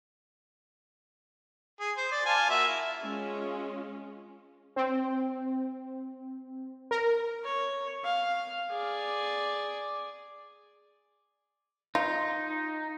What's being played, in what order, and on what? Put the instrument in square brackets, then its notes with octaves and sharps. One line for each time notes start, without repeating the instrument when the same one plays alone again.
[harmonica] G#4
C5
D5
F4 G#5 A5
A#3 F#4 E5
E4
[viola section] G#3 C#4 F4
[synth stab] C4
A#4
[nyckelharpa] C#5
F5
G#4 D5
[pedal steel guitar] D#4 [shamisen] F4